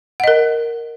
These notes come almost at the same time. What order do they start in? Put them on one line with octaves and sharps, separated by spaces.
F#5 D#5 A#4